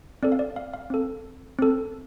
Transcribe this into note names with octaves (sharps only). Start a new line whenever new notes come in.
C4 A4 D5
F5
D5
F5
F5
C4 A4
C4 A4